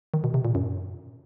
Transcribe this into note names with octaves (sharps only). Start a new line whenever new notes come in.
D#3
B2
C3
A#2
F#2